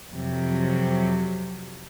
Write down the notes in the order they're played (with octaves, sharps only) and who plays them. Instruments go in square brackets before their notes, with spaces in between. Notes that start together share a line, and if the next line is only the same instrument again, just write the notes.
[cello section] F2 C3 F#3